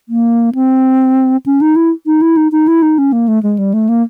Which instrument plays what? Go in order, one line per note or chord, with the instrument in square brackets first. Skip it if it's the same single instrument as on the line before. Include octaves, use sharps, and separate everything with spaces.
[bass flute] A#3
C4
C#4
D#4
E4
D#4
E4
D#4
D#4
E4
D#4
C#4
A#3
A3
G#3
G3
A3
A#3